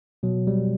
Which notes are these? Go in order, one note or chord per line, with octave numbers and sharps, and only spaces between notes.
B2 F#3
G3